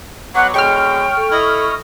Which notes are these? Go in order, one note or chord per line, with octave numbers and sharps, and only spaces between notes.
B2 F#3 F#5 D6
B2 D3 G#3 C#5 G5 C#6 F6
A4
E4 D#5